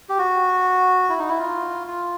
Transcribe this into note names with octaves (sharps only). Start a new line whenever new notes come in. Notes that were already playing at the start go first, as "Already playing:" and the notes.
G4
F#4
E4
D#4
E4
F4
F4